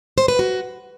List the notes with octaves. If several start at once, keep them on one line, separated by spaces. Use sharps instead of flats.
C5
B4
F#4